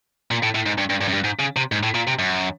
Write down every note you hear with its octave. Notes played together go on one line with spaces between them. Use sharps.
A#2
A2
A2
G#2
G2
G2
G2
F#2
G2
G#2
C#3
C3
G#2
A2
A#2
C3
F#2